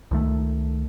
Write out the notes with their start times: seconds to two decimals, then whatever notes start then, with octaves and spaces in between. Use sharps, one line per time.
0.11 C#2 D#3 A3